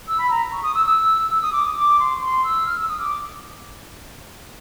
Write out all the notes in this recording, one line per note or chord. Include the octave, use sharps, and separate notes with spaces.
E6
B5
A#5
C#6
D#6
E6
E6
E6
D#6
D6
D#6
D6
C6
C#6
C6
E6
F6
E6
D#6
D6